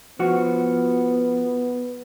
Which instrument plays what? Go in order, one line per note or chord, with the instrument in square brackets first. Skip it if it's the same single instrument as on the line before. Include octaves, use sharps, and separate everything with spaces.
[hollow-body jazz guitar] F3 F#4 [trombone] B3